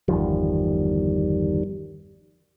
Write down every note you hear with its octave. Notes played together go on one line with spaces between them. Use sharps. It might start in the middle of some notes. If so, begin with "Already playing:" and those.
G1 E2 D#3 F3 G3